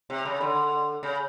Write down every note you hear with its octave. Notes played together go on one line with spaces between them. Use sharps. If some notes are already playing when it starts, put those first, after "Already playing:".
C3
C#3
D3
C#3